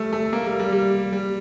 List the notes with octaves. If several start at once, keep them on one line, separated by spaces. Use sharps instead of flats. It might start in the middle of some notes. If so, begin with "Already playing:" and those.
Already playing: G3 A3
A3
A#3
G3
G3
G3
G3